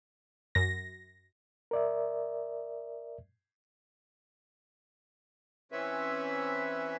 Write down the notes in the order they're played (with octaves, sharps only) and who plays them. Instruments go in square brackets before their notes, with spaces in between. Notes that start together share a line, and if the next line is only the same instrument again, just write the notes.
[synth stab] F#2 A#6
[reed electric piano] A#4 D5 E5
[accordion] E3 C4 C#4 B4 E5